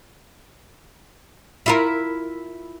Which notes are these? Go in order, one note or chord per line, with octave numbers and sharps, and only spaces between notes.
E4 F4 A#4